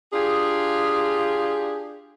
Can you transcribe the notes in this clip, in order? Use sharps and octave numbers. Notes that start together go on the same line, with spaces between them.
D4 F4 G4 G#4